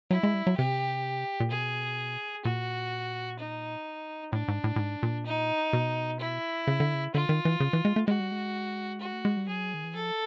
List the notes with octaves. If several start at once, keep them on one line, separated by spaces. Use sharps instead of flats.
F#3 E4
G#3
G3
F#3
C3 G4
A#2
B2 G#4
A#2 F#4
D#4
A2 D4
G#2
A2
A2
G#2
A#2
D#4
B2
E4
C#3
D3
C#3
D3 F4
D#3
E3
C#3
E3
G#3
A3
G#3 F#4
G3
G#3
F#4
A3
G#3
G3
F#3 G#4
D#3
E3
F3 A4